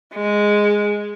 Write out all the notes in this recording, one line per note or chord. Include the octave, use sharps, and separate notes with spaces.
G#3